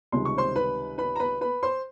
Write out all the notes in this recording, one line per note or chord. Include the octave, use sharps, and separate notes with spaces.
C#2 C3 D#3 G3 C6
C#6
C5 C6
B4 B5
B4 B5
A#5
B4 B5
B4 B5
C5 C6